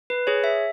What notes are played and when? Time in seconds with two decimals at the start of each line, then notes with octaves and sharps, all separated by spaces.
0.10 B4
0.27 G#4 C#5
0.44 E5